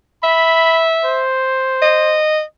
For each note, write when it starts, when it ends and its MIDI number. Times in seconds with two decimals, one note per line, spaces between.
0.23 1.23 76
0.23 0.85 83
1.05 2.22 72
1.82 2.42 75